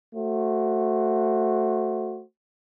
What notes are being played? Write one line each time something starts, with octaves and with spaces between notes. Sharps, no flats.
A3 F#4 C5